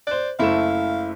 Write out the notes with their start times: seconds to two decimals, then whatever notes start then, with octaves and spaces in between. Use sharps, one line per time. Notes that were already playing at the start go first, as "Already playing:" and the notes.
0.07 C5 D5 F#6
0.39 F#1 A3 E4 F5 E7